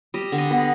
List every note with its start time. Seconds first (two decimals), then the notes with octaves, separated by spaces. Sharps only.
0.14 G3 D#5
0.32 D3
0.38 D#5
0.51 B3